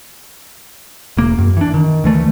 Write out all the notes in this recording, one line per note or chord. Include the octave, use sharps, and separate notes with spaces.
E1 A#3
F#2
E3 D4
D#3
D2 E3 A3